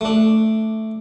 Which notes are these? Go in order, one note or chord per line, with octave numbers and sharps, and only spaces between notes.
A3 D4